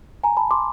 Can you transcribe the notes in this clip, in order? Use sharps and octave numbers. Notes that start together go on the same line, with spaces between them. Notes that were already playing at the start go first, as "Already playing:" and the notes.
G#5 A#5
A5 B5
C6 D6